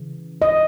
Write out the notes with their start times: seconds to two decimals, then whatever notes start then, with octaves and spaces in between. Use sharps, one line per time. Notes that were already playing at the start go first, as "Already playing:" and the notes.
Already playing: C#3 E3
0.42 D#5